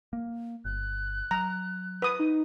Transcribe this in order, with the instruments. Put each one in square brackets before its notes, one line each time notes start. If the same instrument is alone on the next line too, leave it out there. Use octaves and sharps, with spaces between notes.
[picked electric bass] A#3
[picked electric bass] G1 [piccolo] F#6
[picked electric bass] F#3 [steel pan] A#5
[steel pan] B4 D#6
[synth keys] D#4